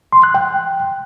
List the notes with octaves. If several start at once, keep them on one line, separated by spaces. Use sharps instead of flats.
C6
F#6
G5